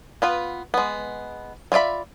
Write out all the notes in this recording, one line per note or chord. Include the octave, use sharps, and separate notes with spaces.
B3 F4 B4
G#3 B3
G3 F4 D5 E5 B5